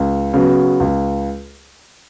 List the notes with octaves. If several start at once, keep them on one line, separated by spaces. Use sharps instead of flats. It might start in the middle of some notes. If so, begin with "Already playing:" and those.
Already playing: C#2
C#3 F#3 B3 F#4
C#2